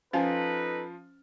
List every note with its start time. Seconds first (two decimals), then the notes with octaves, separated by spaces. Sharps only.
0.13 F3 C#4 D#4 F4 A4 B4 C5 G#5